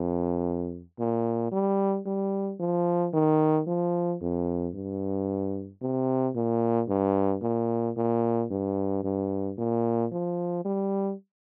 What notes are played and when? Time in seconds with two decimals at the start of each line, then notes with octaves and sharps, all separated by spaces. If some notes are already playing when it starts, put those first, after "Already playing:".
Already playing: F2
0.99 A#2
1.52 G3
2.06 G3
2.60 F3
3.13 D#3
3.67 F3
4.21 F2
4.74 G2
5.81 C3
6.35 A#2
6.89 G2
7.42 A#2
7.97 A#2
8.50 G2
9.04 G2
9.58 A#2
10.11 F3
10.64 G3